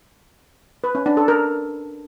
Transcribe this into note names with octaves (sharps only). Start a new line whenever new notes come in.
B4
C#4
D4
A4
A#4